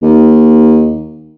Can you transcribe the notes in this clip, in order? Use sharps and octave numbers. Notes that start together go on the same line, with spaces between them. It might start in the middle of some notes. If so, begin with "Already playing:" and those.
D#2